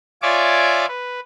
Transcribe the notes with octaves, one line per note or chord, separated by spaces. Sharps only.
F4 C#5 D5 E5 G#5 D6
B4